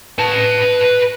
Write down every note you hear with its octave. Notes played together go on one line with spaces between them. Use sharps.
B4 A5